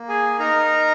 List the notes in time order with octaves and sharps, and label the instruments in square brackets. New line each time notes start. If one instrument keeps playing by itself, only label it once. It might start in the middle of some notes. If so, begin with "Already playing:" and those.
Already playing: [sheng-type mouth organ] A#3
G#4 G#5
D#4 A#4 A#5